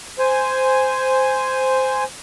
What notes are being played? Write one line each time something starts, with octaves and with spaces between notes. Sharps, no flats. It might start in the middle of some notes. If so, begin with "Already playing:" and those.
C5 G#5